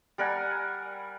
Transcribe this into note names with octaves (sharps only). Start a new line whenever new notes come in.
G3 A#4 F#5 G#5